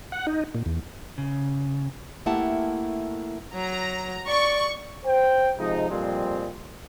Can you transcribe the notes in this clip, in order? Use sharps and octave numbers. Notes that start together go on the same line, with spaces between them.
F#5
D#4
A#2
E2
C#3
A3 A#3 E4 G4 F#5 A5
F#3 A#5
D5 C#6
C5 G5
C3 F3 G#3 D#4
F2 A#2 G3 G#3 C4